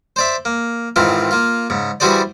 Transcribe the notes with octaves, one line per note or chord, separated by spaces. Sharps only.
C5 D5 E5
A#3
G#2 D#3 E3 C4 F4
A#3 F4
G#2 C#3
E3 G3 F#4 G#4 C5 D5